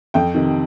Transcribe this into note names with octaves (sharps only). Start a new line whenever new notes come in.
F2 G5
C3 D#3